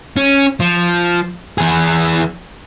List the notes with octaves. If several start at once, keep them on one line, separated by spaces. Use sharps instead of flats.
C#4
F3
E3 G#4